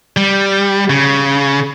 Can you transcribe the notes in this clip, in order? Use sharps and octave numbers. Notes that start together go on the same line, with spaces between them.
G3
C#3